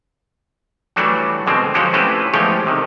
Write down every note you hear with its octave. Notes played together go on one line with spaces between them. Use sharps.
E3 F#3 G3 A3 D4 F#4
B2 D3 G#3 C4
F3 F#3 G#3 F#4 G4
A3 C4 C#4 E4 G4 B4
E2 F3 G#3 A3 G4 C#5
C3 D#3